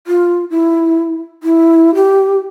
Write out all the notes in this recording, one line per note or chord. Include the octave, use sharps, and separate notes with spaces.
F4
E4
E4
G4